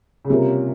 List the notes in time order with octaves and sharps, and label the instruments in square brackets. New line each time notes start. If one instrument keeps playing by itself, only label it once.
[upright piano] C#3
[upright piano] C3 [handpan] G3 A#3 C#4 F4 A#4